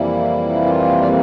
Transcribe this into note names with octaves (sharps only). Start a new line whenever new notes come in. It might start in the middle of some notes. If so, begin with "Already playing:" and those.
Already playing: F2 C3 E3 G3 A#3 E4
F4
D5
C4